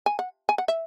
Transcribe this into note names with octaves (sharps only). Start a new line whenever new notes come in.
G#5
F#5
G#5
F#5
E5